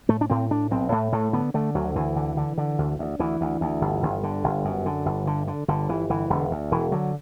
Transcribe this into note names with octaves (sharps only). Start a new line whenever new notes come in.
A2 A3
D4
A2 C4
A2 D4
B1 C4
A2 A3
A2 A3
D3 B3
D3 A3
D2 F#3
D2 E3
D3
D3
D3
D2
D2
D2 E3
D2
D2
G1
G1
D3
G1
F#2
D3
G1
D3
D3
G1 D3
G1 E3
G1 E3
E1 D3
D2
E1 E3
D3 F#3